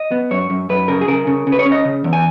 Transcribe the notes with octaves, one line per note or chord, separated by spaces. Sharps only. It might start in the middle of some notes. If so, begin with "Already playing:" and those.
Already playing: D#5
B3
F#2 C#5
F#2
F#2 B4
C#3 A#4
G#4
C#3 A#4
C#3
C#3
B4
C#5
C#4
D#5
C#3
E2
G#5